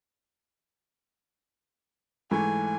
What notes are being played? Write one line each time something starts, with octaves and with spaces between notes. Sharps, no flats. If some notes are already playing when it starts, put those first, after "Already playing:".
G#2 E3 A3 G#5